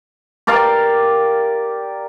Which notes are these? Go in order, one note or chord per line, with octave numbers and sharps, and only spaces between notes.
G4 A#4 D5 F5